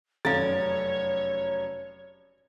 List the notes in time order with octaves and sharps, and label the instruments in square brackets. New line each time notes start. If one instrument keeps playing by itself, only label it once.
[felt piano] F1 F#2 A#5 [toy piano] A4 F5 [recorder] C#5 [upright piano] A6